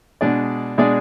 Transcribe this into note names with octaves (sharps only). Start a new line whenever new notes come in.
B2 G#3 D4 G#4 D5
B2 G#3 D4 G#4 D5